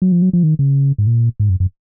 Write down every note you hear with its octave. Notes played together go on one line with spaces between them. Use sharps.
F#3
F3
F#3
F3
D#3
C#3
G#2
A#2
G#2
F#2
F#2